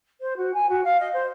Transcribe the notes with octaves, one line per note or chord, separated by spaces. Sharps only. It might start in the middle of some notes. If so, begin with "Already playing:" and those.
C5
F#4
G#5
F#4
F5
D#5
C5